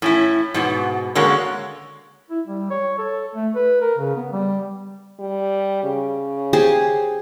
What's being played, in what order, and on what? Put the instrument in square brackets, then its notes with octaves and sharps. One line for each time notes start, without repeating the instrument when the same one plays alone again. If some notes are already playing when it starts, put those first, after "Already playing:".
[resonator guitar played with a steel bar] A2 C#4 E4
G#2 B2 B3
D3 G#3 A#3 C#4 F#4 C#5
[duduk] E4
G3
C#5
A4
A3
B4
A#4
C#3
B3
G3
[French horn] G3
C#3
[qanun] G4 G#4 C5